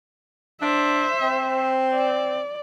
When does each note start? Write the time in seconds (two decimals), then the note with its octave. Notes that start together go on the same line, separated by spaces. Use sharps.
0.61 D4 C5 E5
1.22 C4
1.94 D5